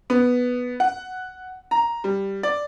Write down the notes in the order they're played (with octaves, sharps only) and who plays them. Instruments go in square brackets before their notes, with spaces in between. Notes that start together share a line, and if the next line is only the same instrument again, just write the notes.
[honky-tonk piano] B3
F#5
A#5
G3
D5